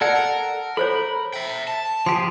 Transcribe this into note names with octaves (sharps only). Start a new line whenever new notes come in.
A4 A#4 D5 F#5
A4 C5 C#5 B5
E5 G5
A5
F3 G4 G#4 C6